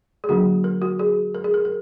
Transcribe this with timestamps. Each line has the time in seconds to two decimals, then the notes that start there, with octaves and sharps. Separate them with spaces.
0.24 G#4
0.29 D3 F#3 A#3 D4 F#4
0.64 A#4
0.82 F#4
0.99 G#4
1.35 A#4
1.44 G#4
1.54 A#4
1.65 A#4